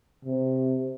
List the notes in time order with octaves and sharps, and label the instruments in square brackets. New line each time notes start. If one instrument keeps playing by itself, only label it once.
[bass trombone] C3